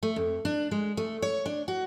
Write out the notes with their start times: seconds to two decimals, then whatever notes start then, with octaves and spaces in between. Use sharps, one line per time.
0.03 A3
0.16 F2
0.45 D4
0.71 G#3
0.97 A3
1.22 C#5
1.46 D4
1.68 F#4